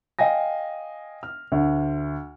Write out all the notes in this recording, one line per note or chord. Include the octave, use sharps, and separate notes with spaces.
D#5 F5 G5 G#5 A#6
F6
D2